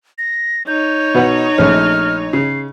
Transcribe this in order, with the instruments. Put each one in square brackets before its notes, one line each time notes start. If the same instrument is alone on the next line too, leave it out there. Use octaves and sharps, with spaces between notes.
[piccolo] A#6
[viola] D#4 C#5 [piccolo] G6
[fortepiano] B2 B4 F#5
[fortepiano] A#1 A3 C#4 [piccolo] F6
[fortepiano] C#3 [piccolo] C7